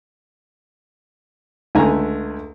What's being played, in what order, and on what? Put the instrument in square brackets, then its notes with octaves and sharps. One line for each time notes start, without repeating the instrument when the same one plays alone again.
[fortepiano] C#2 D3 A3 G#5 A#5